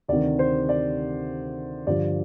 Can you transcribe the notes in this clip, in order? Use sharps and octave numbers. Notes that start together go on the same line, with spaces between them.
D2 C3 D#3 D5
C5
D5
G2 D3 F3 D5